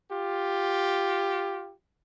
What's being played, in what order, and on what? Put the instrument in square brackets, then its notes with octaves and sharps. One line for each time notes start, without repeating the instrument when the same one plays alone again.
[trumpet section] F4 G4